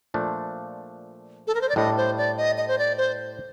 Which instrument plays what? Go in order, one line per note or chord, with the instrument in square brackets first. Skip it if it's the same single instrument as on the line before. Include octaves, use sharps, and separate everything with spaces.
[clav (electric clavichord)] A#2 F3 A3 D4
[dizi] A4
A#4
C5
D5
[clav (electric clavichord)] A2 G3 D4 A4 [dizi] D#5
[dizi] C5
D5
D#5
D#5
C5
D5
C5